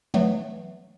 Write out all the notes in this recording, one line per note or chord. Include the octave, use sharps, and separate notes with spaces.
E3 F#3 A3 B3